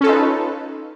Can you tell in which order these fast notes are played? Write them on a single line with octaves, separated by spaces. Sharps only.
C#4 A4 F4 D#4 B4